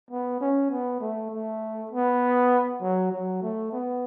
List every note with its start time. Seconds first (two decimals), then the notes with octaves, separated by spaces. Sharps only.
0.11 B3
0.41 C#4
0.70 B3
1.00 A3
1.30 A3
1.91 B3
2.81 F#3
3.12 F#3
3.42 A3
3.73 B3